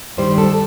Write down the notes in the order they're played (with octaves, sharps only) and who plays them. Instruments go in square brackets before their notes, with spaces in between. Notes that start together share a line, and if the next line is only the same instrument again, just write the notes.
[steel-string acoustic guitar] G2 D#3 G3 C5
A4